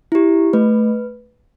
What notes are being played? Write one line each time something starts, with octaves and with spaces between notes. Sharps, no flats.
E4 G4
A3 B4